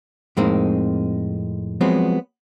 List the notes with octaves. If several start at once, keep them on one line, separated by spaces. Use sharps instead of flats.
F2 A2 G#3 A#3 C4 D#4
F3 F#3 G#3 B3 C4